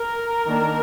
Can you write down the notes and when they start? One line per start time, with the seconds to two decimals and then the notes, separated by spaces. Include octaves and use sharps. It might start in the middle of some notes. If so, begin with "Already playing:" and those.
Already playing: A#4
0.46 D#3 A#3 D4